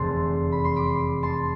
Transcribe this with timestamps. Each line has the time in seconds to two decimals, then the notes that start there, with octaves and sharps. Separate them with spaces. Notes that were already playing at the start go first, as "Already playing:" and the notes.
Already playing: F1 E2 C3 E3 A5 C6
0.52 B5
0.64 C6
0.76 B5 D6
1.23 A5 C6